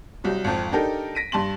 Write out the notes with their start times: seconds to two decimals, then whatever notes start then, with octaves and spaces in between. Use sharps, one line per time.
0.24 C2 F#3 G3
0.44 G#1 F2
0.72 D4 D#4 G4 A4 A#4
1.15 A#6 B6 D7 D#7
1.32 G2 A5 C6 F#7